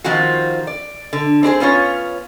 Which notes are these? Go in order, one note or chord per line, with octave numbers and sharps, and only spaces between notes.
D#3 F3 C4 F4 F#4
D5
D3
C4 D4 G#4 C5
B3 C#4 F4 C#5